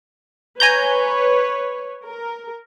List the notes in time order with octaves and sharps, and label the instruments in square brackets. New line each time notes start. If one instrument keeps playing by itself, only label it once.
[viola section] B4 C#5 [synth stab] G#5 A#5 G6
[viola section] A#4